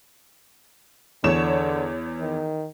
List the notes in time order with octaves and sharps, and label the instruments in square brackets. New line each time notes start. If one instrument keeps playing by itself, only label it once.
[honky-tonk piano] E2 C#5 E7 [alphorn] D3
[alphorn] D#3